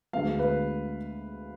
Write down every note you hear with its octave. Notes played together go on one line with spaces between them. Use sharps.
D2 D3 G#3 B3 F5
B4